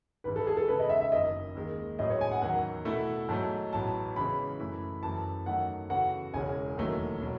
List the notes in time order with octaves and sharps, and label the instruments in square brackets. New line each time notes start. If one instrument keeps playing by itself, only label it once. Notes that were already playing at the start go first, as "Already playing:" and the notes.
[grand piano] G#1 G#2 E3 G#3 [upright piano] B4
[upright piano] A4
G#4
A4
[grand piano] E2 C#3 G#3 [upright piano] B4
[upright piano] D#5
E5
E5
[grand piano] F#1 F#2 D#3 [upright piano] D#5
[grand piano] D#2 D#3 G#3
[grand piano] A2 F#3 C#4 G#4 [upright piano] D#5
[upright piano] C#5
G#5
F#5
[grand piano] E2 D#3 F#3 [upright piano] F#5
[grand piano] B2 A3 E4 A4
[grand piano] G#2 F#3 A3 [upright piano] A5
[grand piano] A1 G#2 F#3 B3 [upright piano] A5
[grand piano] C#3 E3 G#3 C#4 [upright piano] B5
[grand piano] F#2 E3 A3 E4 B4
[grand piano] F#2 E3 A3 [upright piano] A5
[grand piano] E2 D#3 F#3 A3 D#4 [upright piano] F#5
[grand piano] C#3 E3 B3 F#4 A4 [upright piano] F#5
[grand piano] E1 E2 C#3 G#3 C#4 [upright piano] G#5
[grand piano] E1 D#2 D#3 F#3 A3
B2 F#3